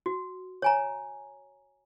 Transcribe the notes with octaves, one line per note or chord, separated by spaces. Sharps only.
F#4
C#5 G#5 A#5